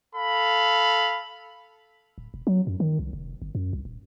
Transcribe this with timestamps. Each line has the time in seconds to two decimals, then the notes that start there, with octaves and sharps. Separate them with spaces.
0.14 A4 F5 B5
2.18 D1
2.34 E1
2.47 F#3
2.67 F#2
2.80 D#3
2.99 C2
3.13 F1
3.42 G1
3.55 F#2
3.73 C2
3.85 D#1